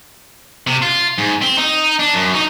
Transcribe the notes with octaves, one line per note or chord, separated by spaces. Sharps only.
C3
F4
G#2
C4
D#4
D4
F#2
D#4